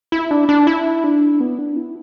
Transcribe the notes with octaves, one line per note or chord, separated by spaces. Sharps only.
E4
D4
D4
E4
D4
B3
D4
E4